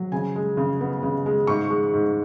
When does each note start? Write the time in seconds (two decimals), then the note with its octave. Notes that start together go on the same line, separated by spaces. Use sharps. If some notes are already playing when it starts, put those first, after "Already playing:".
Already playing: F#3
0.12 C#3 G#5
0.35 G#3
0.57 C#3
0.81 B3
1.03 C#3
1.26 G#3
1.47 G#2 C#6
1.70 G#3
1.94 G#2